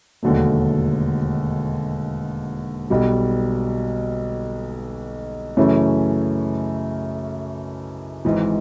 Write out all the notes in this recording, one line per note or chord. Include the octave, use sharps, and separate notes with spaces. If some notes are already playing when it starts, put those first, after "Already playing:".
E1 D#2 D3 F#3 A3
B1 B2 G3
F#2 C#3 E3 A3 C#4
G#1 G#2 E3